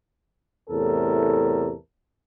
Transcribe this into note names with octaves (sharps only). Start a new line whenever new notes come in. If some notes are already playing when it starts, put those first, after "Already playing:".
E2 A2 C3 A4 A#4